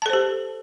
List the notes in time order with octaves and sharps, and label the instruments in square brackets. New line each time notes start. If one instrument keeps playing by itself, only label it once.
[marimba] A5
A4
C5
G4